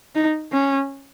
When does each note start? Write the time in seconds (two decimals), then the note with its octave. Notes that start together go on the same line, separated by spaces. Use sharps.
0.15 D#4
0.52 C#4